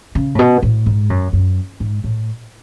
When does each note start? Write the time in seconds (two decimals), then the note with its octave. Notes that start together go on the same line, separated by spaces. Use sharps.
0.15 C#3
0.35 A2
0.39 B2
0.63 A2
0.86 G#2
1.10 F#2
1.33 F#2
1.80 G#2
2.04 A2